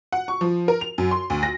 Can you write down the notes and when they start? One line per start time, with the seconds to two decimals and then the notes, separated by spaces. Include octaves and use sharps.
0.13 F#5
0.28 C#6
0.41 F3
0.68 A#4
0.81 F7
0.98 F#2
1.11 C6
1.30 D2
1.43 A#6